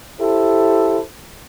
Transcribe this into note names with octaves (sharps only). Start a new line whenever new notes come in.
E4 G4 A4 C5